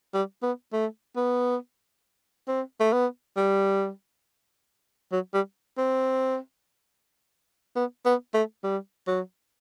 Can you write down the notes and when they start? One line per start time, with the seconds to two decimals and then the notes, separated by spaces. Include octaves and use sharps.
0.14 G3
0.43 B3
0.73 A3
1.16 B3
2.48 C4
2.80 A3
2.93 B3
3.37 G3
5.12 F#3
5.34 G3
5.78 C4
7.76 B3
8.06 B3
8.34 A3
8.64 G3
9.07 F#3